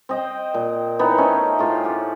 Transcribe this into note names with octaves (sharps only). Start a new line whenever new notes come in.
C4 D#5 G5
A#2
E3 B3 D#4 C#5
A3 C4 C#4 D#4
A2 F4 G#4
G4 F#5